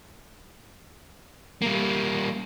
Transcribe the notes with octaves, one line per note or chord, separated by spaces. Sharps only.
G3 A#3